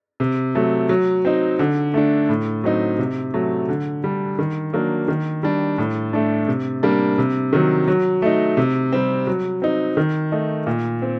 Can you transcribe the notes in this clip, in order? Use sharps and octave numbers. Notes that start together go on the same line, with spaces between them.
C3
F#3 A3
F#3
C4 D#4
D3
A3 D4
A2
F#3 C4 D#4
C3
F#3 A3
D3
G3 D4
D#3
F#3 A#3 D4
D#3
G3 D4
A2
A3 D4
C3
G3 A#3 D4
C3
D#3 F#3
F#3
A3 D#4
C3
G3 C4
F#3
C4 D#4
D#3
A3 D#4
A#2
C4